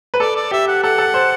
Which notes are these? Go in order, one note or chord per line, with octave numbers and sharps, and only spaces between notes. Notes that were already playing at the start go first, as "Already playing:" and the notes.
B4
A4 D5
D5
G4 E5
F#5
A4 F#5
A4
C5